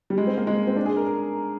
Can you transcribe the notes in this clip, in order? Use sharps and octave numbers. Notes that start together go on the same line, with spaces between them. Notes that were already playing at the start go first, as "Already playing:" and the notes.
G3
G#3
C4
A#3
G#3
C4
D4
G#4
A#4
A#4